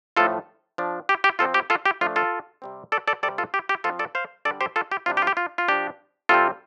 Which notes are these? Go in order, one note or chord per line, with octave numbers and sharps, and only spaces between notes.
A2 F3 A3 F4 A4
F3 D4
G4
G4
F3 C4 F4 A4
G4
F4 A4
G4
F3 A3 D4 F4
F4 A4
C3 G3 C4
A4 D5
A4 D5
C3 G3 C4 A4 D5
F4 A4
G4
G4
F3 C4 F4 A4
A4 D5
C5 F5
D3 G3 D4 A4 D5
G4 C5
F4 A4
G4
C3 G3 D4 F4
G4
F4
G4
F4
F4
F3 D4 G4
C3 G3 C4 F4 A4